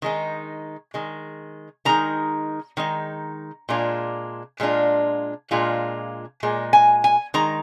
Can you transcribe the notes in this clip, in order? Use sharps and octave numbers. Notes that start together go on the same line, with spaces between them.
D#3 G#3 D#4
D#3 G#3
D#3 G#3 D#4 A#5
D#3 G#3 D#4
A#2 G#3 D4 F4
A#2 G#3 D4 F4
A#2 G#3 D4 F4
A#2 G#3
G#5
G#5
D#3 G#3 D#4 A#5